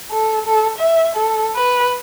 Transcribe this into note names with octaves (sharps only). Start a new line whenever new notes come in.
A4
A4
E5
A4
B4